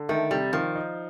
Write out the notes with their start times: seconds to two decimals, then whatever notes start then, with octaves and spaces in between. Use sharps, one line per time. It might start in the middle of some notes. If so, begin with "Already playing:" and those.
Already playing: D3
0.09 D#3 A3
0.31 C3 G3
0.53 D#3 F3
0.75 D#4